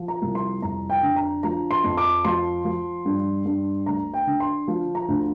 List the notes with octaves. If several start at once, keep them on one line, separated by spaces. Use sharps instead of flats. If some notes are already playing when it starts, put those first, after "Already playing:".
Already playing: F3
A#5
C2
C6
F2 A#5
G5
D3
A#5
F3 A#5
C6
F2
D6
F3 C6
F3
G2
G2
D2 A#5
G5
D3
C6
F3
A#5
D2